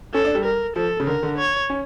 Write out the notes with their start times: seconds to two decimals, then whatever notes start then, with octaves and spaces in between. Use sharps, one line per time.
0.14 C#4 A4
0.25 D4
0.35 G3
0.45 A#4
0.76 F3 A4
1.00 C#3
1.07 D3 A#4
1.23 D3
1.38 C#5
1.70 C#4